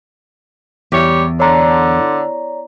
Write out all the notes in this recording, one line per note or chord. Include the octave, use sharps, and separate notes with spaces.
E2 G3 G4 C#5
D3 C#5 D5 A#5